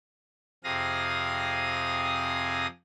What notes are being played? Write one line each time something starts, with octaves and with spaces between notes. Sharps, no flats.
F2 C3 G#4 F5 D#6 A#6